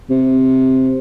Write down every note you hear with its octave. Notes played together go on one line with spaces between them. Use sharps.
C3